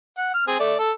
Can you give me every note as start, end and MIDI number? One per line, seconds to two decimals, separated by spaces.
0.18 0.32 78
0.34 0.44 89
0.47 0.58 60
0.47 0.58 68
0.59 0.75 57
0.59 0.75 74
0.79 0.91 69